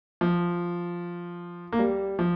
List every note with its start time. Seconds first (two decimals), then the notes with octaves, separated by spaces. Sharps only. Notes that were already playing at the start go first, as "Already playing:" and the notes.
0.21 F3
1.72 A#3
1.79 G3
2.19 F3